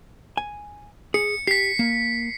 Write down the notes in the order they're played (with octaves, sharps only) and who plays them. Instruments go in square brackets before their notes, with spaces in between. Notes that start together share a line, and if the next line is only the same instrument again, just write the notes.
[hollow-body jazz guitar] G#5
[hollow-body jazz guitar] G#4 [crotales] C#7
[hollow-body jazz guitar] G4 [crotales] B6 C7
[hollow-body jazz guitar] A#3